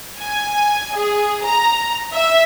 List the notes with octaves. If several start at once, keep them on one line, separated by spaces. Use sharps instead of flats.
G#5
G#4
A#5
E5